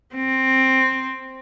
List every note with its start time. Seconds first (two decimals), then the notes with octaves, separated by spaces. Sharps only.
0.14 C4